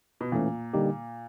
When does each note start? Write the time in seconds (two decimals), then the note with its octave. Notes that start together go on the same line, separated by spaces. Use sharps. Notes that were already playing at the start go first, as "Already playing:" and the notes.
0.21 B2
0.32 A#2 E3 A3 C#4
0.74 D3 G3 A#3 D#4 G4